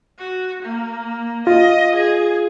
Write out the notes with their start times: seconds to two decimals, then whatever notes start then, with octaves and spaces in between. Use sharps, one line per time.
0.19 F#4
0.63 A#3
1.47 F4 D#5
1.96 G#4